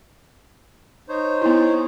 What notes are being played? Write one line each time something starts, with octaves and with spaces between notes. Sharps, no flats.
D#4 C5 C#5
B3 E4